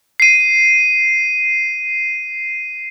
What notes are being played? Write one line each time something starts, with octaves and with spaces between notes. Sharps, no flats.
C7 D#7